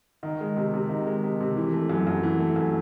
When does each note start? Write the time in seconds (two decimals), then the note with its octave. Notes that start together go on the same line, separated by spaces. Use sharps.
0.23 D#3
0.41 G#3
0.57 C3
0.73 C3
0.89 D#3
1.07 G#3
1.23 C3
1.41 C3
1.56 E3
1.73 A3
1.90 F#2
2.07 F#2
2.23 E3
2.40 A3
2.56 F#2